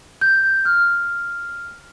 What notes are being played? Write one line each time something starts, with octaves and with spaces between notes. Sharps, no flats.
G6
F6